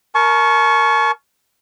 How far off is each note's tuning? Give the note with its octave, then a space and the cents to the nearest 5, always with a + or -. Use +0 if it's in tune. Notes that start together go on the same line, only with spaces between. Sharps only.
A#4 +0 A5 -45 C#6 +0